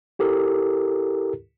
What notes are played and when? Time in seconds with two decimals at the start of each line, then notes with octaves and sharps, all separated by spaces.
0.19 E4 G4 A4 A#4